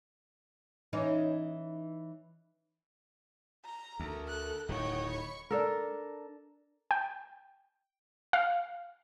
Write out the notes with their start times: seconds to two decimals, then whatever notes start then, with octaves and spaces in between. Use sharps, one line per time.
0.93 E3 C#4 D#4
3.65 A#5
4.00 D2 A4 A#4
4.28 F#6
4.69 D1 D#3 C#5 D#5 F#5 G5
5.08 B5 C#6
5.51 D4 A4 A#4
6.91 G5
8.33 F5